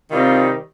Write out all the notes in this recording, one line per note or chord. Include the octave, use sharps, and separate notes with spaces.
C3 D#3 G3 C4 D#4 F4